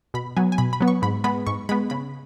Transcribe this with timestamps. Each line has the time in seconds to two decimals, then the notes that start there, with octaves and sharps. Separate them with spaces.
0.14 B2 B5
0.37 F#3 B3 G#5
0.52 G#5
0.58 B2 B5
0.73 B5
0.81 F#3 B3
0.88 C#6
1.02 G#2 B5
1.24 G#3 B3 B5
1.47 G#2 C#6
1.69 G#3 B3 B5
1.90 C#3 B5